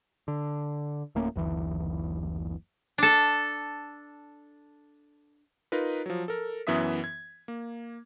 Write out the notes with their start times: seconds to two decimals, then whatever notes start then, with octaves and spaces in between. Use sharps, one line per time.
0.28 D3
1.15 D1 A3 A#3 C#4
1.35 F#1 D2 E3
2.98 D4 A4
5.72 D#4 F4 A#4 B4
6.06 F3 F#3
6.28 A4 A#4
6.67 F#2 E3 B3 E5 D#6 B6
7.04 G#6
7.48 A#3